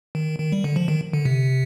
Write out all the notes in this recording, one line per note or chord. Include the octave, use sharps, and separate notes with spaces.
D#3
D#3
G3
D3
F3
D#3
D3
C3